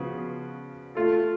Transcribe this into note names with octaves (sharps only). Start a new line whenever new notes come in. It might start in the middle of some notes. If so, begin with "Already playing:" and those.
Already playing: C#3 F3 B3 F#4 B4
A3 F4 A4